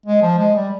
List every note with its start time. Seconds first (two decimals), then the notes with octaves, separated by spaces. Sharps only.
0.06 G#3
0.22 F3
0.38 G#3
0.56 G3